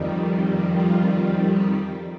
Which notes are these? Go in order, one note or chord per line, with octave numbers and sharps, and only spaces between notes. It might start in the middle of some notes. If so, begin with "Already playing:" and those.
Already playing: F2 D#3 G3
F4
G4